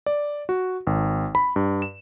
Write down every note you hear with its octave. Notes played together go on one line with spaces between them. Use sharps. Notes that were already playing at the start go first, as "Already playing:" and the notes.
D5
F#4
G#1
B5
G2
E7